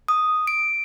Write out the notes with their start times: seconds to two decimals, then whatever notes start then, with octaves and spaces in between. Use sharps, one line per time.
0.08 D#6
0.47 D7